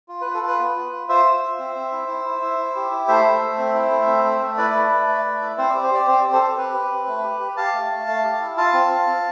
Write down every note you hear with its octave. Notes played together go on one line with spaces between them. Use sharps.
F4
F4 B4
A4
F4 B4
B3
F4
F4
F4 C5 E5
F4
F4
C4
C4
E4
E4
E4
E4
E4
G4
E4
A3 C5 E5
A3
A3
C4
E4
A3
C4
A3
A3
E4 B4 D5
A3
A3
A3
A3
E4
C4 C5
G4 D5
C5
G4 D5
C4 C5
G4 D5
A4 C5
G4
C4 B4
G4
C4
A3
G4
G4
G4 F5 A5
A3
A3
A3
G4
E4
F4 F5 A5
C4
F4
C4